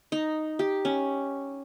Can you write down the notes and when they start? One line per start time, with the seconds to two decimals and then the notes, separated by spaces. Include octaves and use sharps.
0.12 D#4
0.59 G4
0.85 C#4